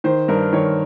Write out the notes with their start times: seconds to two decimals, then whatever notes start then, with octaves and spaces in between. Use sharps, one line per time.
0.04 D#3 C5
0.28 G2 A#4
0.52 D#3 C#5